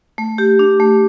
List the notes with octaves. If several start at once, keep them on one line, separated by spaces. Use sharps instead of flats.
A3
G4
D4
A3